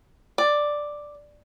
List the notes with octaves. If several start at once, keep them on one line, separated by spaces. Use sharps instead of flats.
D5